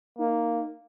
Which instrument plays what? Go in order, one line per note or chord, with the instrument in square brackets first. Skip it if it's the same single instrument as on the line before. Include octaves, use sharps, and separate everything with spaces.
[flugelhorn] A#3 [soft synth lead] D#4